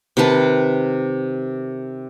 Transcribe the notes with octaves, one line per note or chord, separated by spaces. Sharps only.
C3 D#3 B4 A5